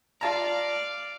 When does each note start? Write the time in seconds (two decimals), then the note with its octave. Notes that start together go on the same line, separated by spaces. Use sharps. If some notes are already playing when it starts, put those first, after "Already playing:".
0.21 F4 D5 F5 A5 A#5